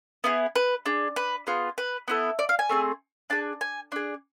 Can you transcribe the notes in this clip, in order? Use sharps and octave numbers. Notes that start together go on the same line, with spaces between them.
B3 E4 G#4
B4
D4 G#4
B4
B3 F4 G#4
B4
B3 E4 A4
D5
F5
G#5
A3 C4 G#4
D4 G#4 A5
G#5
D4 G#4